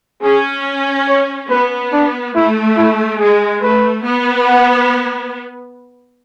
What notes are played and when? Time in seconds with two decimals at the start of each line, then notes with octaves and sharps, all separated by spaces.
0.23 C#4 G#4
1.08 C#5
1.50 B3 B4
1.92 D4
2.35 A3 E4
2.77 E4
3.19 G#3 G#4
3.62 A3 B4
4.04 B3
4.46 F#5